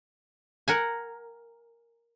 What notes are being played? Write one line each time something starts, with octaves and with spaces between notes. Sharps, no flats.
A#4 F#5 G#5